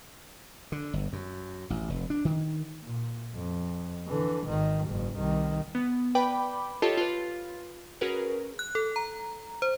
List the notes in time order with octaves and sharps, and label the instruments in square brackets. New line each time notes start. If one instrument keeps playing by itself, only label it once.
[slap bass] D3
G1
F#2
A1
F1
D4
D#3
[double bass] A#2
F2
D3 E3
G#1 D#3
F#1 G#2
C2 D#3
[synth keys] B3
B4 D5 G5 B5 D6
F4 G4 A4 C#5 D#5 A5
F4 B4
C#4 F#4 G#4 A#4 B4
[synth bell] F#6
A4
A#5
C5